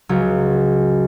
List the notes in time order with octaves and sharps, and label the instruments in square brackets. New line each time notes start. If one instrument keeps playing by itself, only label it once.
[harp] C#2 F#3